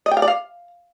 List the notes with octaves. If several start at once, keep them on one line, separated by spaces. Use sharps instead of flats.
D#5
G5
F5
D5
F5